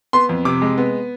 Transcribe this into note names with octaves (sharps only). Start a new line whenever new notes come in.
B3 C6
F2
C3 D6
G#3
B3